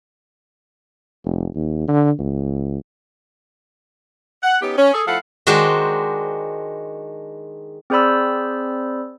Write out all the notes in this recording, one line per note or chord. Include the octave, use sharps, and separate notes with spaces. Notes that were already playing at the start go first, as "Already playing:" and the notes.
F1
D#2
D3
C#2
F#5
B3 C#4 D#4 G4
C#4
G#4 A4
F3 A3 E4 A4 F5 F#5
D#3 G#3 D4 F#4 C5
C4 G#4 C5 D5 B5 E6